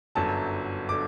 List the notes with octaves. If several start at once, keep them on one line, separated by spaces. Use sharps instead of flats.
G1 F#2 D3 F#3 A5
D3 D6